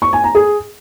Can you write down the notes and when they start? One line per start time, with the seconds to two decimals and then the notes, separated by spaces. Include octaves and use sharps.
0.02 C#6
0.13 G#5
0.24 A#5
0.35 G#4